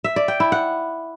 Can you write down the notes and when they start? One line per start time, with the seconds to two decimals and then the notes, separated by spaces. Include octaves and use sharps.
0.04 E5
0.16 D5
0.28 G5
0.40 E4
0.52 F#5